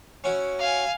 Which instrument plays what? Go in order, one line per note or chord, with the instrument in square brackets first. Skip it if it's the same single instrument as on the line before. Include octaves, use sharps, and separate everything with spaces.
[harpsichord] C#4 E4 F#4
[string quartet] F5 G#5